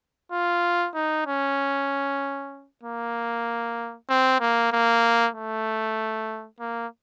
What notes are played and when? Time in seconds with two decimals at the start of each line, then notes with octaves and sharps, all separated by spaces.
0.32 F4
0.95 D#4
1.27 C#4
2.83 A#3
4.10 C4
4.41 A#3
4.72 A#3
5.35 A3
6.60 A#3